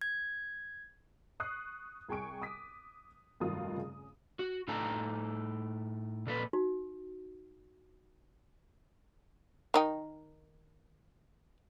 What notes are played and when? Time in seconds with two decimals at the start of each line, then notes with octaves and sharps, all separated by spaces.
0.01 G#6
1.40 C#6 D#6 F#6 C7
2.08 C2 G#4 G5 G#5 C#6 D7
2.42 D6 D#6 B6
3.40 F1 G2 D#3 F#3 F4 D#6
3.77 C#3
4.39 F#4
4.68 A2 D#4 A4 G5 A5 A#5
6.27 A#2 A4 B4
6.53 D#4 F#4
9.74 D#3 D#4 G5